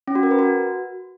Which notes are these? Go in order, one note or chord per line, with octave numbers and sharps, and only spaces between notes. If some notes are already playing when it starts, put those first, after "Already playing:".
C#4
F#4
A#4
B4
F#4